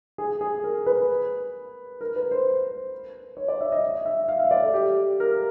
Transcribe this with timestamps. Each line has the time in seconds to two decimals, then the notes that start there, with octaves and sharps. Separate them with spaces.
0.18 G#4
0.41 G#4
0.64 A#4
0.86 B4
2.01 A#4
2.16 B4
2.31 C5
3.37 C#5
3.48 D5
3.61 E5
3.72 D#5
4.06 E5
4.28 F5
4.39 E5
4.51 D5
4.62 A4
4.74 G4
5.20 A#4